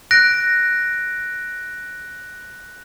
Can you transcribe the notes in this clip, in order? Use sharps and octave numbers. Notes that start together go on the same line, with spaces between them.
F#6 A#6 D7